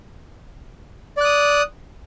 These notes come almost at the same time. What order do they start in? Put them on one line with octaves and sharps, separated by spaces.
D5 F#6 D#6